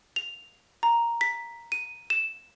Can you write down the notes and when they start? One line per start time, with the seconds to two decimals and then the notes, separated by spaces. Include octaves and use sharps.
0.16 F7
0.83 A#5
1.21 B6
1.72 D#7
2.10 E7